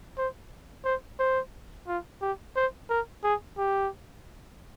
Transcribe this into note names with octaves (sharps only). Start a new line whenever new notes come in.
C5
C5
C5
F4
G4
C5
A#4
G#4
G4